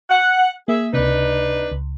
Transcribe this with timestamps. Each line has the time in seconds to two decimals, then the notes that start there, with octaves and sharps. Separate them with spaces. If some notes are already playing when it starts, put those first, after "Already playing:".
0.10 F#5
0.68 A#3 G#4 E5
0.93 C#2 C3 D4 D#4 B4
1.71 C#2